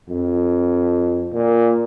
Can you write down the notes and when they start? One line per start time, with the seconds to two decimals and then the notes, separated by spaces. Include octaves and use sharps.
0.10 F2
1.33 A#2